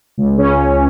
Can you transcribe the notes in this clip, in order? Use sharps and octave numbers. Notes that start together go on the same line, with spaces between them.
C#2
C#3 C#4